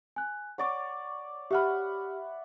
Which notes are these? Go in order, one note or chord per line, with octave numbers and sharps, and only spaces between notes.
G#5 F#6
C#5 D5 F#5 C#6 D6
G4 E5 F#5 B5 F6